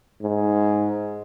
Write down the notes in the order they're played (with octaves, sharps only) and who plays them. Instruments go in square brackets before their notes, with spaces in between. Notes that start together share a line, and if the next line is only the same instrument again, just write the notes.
[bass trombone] G#2